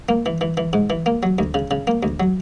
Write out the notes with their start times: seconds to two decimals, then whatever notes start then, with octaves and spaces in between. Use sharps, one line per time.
0.09 A#3
0.26 E3
0.41 E3
0.57 E3
0.73 G#2
0.90 E3
1.06 A#3
1.23 F#3
1.39 D2
1.54 C#3
1.71 C#3
1.87 A#3
2.03 D2
2.20 F#3